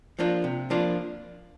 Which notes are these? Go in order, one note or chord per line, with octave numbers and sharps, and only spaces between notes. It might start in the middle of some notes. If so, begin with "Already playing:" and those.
F3 A#3 D4 F4
C3
F3 A#3 D4 F4